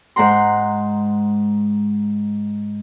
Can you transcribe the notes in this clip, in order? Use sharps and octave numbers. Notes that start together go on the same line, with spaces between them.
G#2 G#3 F#5 A#5 C6